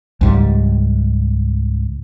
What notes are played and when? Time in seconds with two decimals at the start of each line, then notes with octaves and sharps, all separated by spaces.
0.21 C#2 G#2 G3